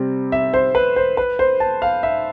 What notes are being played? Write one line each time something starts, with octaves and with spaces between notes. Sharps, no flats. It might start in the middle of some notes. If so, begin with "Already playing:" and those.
Already playing: C3 G3 C4
E5
C5
B4
C5
B4
C5
A5
F5
E5